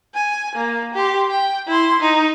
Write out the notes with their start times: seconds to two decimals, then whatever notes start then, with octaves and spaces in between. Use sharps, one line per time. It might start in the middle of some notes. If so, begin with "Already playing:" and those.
0.14 G#5
0.55 A#3
0.94 G4 C6
1.30 G5
1.67 E4 C6
2.00 D#4